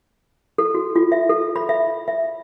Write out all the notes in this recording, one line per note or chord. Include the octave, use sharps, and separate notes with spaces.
A4
F#4
F4
E5
A4
B5
E5
E5